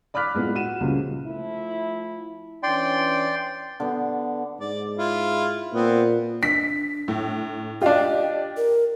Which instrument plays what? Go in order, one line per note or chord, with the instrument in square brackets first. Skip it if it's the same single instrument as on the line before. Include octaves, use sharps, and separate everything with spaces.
[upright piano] D5 B5 D6 F6 F#6 B6
A2 G#3 B3 F4
F#4 D#7 E7
C#2 A#2 C#3 F3 G3 G#3
[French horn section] F3 A3 E4
[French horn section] E3 C#4 D4 [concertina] D5 G5 C6
[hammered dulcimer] D3 B3
[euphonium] G#2 [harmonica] D5
[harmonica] E4 F4
[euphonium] A#2 [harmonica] B3 C4
[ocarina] D4 [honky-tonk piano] B6
[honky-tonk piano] A2
[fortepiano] D4 F4 [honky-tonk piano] G4 D5 [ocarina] D#5
[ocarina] A#4